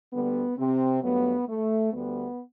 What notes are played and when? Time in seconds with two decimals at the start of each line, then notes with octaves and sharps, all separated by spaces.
0.13 D2 D3 G3 B3
0.58 C3 C4
1.03 G2 F#3 A3 B3
1.49 A3
1.93 D2 D3 G3 B3